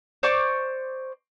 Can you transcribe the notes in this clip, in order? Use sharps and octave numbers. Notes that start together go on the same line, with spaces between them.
C5 D5 C#6 D6